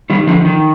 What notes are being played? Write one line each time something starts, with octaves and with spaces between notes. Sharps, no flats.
D#3 G3
D3 F3
D#3